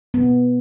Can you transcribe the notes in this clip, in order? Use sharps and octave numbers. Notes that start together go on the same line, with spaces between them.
B3